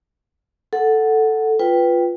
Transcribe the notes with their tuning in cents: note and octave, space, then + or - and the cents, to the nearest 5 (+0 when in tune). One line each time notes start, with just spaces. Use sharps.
A4 +0 F#5 +0
F4 +0 B4 +0 G5 +0